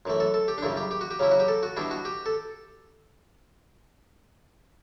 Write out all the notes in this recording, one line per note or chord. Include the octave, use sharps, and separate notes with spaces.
F#2 E3 A3
A4
A4
G4
D4
F#2 C#3 G3 E4
G4
G4
F#4
G4
C#3 F#3 C#4 E4
F#4
G4
A4
F#4
B2 G3 D4 E4
F#4
G4
A4